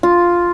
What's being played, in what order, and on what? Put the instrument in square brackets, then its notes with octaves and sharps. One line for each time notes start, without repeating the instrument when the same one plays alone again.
[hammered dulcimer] F4